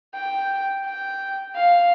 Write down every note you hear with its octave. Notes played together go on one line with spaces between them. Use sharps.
G5
G5
F5